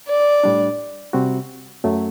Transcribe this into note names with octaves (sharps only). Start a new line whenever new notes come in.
D5
A2 G3 D4
C3 G3 C4 F#4
F#2 F#3 A3